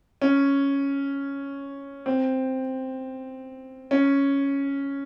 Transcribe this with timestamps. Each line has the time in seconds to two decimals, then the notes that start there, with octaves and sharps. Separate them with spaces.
0.22 C#4
2.06 C4
3.91 C#4